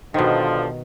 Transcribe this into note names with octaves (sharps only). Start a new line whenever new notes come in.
G2 B2 D3 D#3 F3